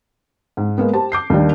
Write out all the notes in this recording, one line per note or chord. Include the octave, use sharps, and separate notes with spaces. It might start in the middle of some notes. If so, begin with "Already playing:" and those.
G#2
G#3 A#3 B3
G4 C5 A5
D6 G6 C7
D#2 D#3 G3 D4